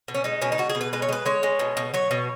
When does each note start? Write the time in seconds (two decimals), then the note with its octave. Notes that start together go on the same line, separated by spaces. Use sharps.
0.08 B2
0.15 C#4
0.24 G#3 D#4
0.42 B2 C#4
0.52 D#4
0.58 B2 F#4
0.70 G#4
0.75 B2
0.81 B4
0.93 G#3 B4
1.02 C#5
1.09 G#3 B4
1.26 G#3 C#5
1.43 G#3
1.59 B2
1.77 B2
1.94 F#3 C#5
2.11 B2